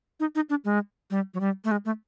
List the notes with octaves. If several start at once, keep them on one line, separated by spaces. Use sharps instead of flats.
D#4
D#4
D4
G#3
G3
F#3
G3
A3
G#3
A3